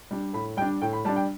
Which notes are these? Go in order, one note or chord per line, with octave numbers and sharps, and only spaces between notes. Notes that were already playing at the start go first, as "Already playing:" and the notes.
G3 D4
A2 B5
G3 D4 G5
A2 G5
B5
G3 D4 A5
G5